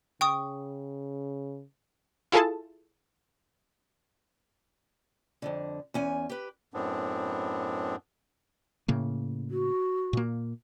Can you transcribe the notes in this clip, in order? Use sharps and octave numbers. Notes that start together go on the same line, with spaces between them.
C#3 G5 C#6 D#6
E4 F4 G#4 A4 A5
F2 G#2 D3
E2 C#4 G#5
G4 B4
F#2 A2 B3 C4 D4
A2 C#3 A#3
F#4
A#2 A#3